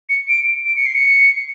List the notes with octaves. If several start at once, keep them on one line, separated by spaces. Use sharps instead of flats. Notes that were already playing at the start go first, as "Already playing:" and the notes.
C#7
D7
D7
C#7
C7
C#7